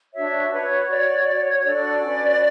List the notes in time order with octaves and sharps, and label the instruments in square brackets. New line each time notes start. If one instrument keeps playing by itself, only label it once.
[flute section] D4 F#4 C#5 E5
F#4 B4 C#5
F#4 C#5 D5
F#4 C#5 D5
C#5
C#5
D4 F#4 A4 D5
C#4 F#4 B4